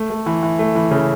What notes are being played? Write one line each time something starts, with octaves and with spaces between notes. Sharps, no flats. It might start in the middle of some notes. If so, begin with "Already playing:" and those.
Already playing: A3
A3
E3
E3
A3
E3
C#3